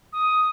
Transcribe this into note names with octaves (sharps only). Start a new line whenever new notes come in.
D#6